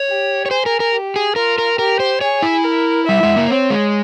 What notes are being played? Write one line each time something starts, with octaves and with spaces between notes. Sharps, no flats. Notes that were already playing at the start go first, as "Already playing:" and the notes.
Already playing: C#5
G4
C#5
G#4 C5
A#4
A#4
G4
G#4
F4 A#4
A#4
G4 A#4
C5
G#4 C#5
E4
A#4
G3 E5
G#3
A#3
C4 C#5
G#3